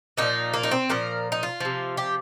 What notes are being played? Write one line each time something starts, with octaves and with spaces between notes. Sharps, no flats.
A#2 F3 D#4
A#3
D#4
C4
A#2 F3 A#4
D#4
F4
C3 F3
G4